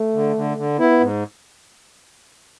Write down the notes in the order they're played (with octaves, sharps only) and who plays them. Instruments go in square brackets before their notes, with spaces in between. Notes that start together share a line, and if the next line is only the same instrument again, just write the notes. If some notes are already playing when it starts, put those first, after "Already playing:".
Already playing: [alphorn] A3
[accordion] D3
D3
D3
[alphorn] B3 [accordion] E4
[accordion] G#2